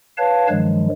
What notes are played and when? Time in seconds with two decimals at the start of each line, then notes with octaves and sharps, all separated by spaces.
0.17 B4 C#5 F5 A5
0.49 G2 D#3 F3 F#3 G#3